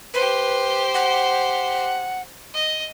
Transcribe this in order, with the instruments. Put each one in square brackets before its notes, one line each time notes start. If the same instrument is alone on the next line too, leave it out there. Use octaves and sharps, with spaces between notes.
[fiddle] G4 C5 [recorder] B4
[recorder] F#5
[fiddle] D#5